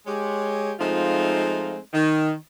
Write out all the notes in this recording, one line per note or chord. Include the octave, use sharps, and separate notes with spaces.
G#3 G4 C#5
F3 G#3 A3 C4 D#4 F4
D#3